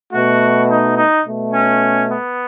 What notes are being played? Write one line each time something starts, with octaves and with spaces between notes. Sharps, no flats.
B2 A3 F#4
D#4
D#4
B2 A3
C#4
B3